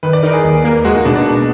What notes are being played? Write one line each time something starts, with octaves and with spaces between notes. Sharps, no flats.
D#3 B4
D5
D#4 A#4
G#4
D#2
A#3
G#3 F#4
D#4
B2 D4
D4
B2